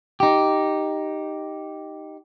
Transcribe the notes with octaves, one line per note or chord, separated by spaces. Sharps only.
D#4 G4